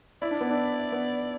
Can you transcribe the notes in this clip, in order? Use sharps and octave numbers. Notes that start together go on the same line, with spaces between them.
E4 D5
D4
B3
D4
B3